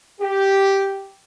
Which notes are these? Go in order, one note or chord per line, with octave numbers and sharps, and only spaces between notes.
G4